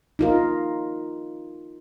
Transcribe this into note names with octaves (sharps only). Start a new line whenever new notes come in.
D#4 F4 A#4